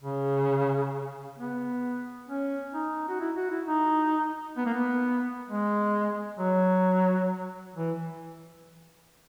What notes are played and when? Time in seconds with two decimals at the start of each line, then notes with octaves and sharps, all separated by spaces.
0.01 C#3
1.38 B3
2.28 C#4
2.74 D#4
3.09 F#4
3.20 E4
3.36 F#4
3.50 E4
3.66 D#4
4.57 B3
4.66 A#3
4.74 B3
5.49 G#3
6.39 F#3
7.76 E3